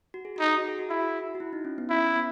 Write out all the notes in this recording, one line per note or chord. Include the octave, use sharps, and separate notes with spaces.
F#4
G#4
D#4 F#4
G#4
F#4
G#4
F#4
E4 G#4
F#4
F#4
E4
D#4
C#4
B3
C#4 E4
C#4
B3